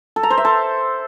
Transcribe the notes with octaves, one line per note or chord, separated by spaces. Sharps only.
A4
A#5
C5
E5
A4